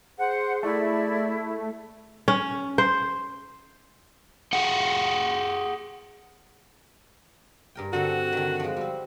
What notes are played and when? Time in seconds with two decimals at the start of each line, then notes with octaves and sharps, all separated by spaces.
0.19 G#4 C5 F#5
0.63 A3 E4 D5
2.28 C#4
2.78 C5
4.53 G4 G#4 F#5 G5
7.75 G2 A#4 G5
7.93 D3 C4 F#4 A4
8.32 D3 D#3
8.60 F3 G#3
8.76 G3 C4